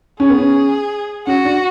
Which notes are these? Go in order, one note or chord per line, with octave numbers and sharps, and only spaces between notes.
C#4 G#4
B3
C#4
C#4 F#4
D4